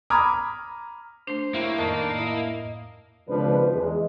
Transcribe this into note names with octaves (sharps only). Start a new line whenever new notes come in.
A#5 B5 D6 D#6 F6 G#6
A3 D4 C5
A#3 E4 G4 A#4 C#5
F2 A2 D#3 D4 D#5 B5
E4 D#5
G#1 C#2 F3 D4 F4 B4
E2 G#3